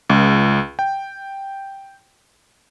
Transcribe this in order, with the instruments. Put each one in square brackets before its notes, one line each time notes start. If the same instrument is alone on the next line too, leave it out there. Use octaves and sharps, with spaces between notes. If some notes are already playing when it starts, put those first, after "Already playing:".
[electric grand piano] C#2
G5